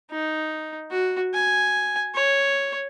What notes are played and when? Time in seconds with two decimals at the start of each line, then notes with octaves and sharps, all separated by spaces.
0.11 D#4
0.91 F#4
1.34 G#5
2.15 C#5